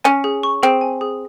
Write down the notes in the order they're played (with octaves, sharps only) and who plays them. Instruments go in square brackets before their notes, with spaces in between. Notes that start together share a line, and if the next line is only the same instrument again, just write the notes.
[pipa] C#4 [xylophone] G#5
[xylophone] G#4
C#6
[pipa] C4 [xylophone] G#4
[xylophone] G#5
G#4